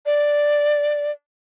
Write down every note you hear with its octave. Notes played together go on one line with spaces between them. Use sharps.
D5